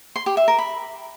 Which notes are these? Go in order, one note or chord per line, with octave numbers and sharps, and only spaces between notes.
C6
G4
E5
A#4
B5